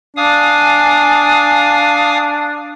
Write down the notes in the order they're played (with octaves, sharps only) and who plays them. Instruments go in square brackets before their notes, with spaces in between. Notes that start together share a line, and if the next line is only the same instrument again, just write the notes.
[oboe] D4 [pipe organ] F5 G#5 D#6